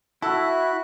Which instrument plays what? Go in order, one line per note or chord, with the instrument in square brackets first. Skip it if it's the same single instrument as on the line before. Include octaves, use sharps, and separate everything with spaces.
[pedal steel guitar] E4 [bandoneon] F#4 F#6 [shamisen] A4